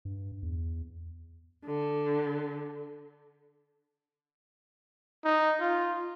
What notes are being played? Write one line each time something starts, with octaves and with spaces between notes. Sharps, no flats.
G2
E2
D3
D#4
F4